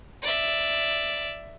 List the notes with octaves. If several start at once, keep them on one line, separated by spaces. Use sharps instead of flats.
D5 E5